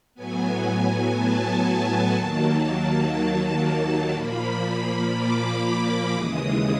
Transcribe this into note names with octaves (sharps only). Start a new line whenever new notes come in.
A2 F#3 B3 G#5
G#5
A5
D#2 D#3 F#3 A#3
A#2 F3 A#3 B5
D6
D#2 C#3 E3 G#3 D#6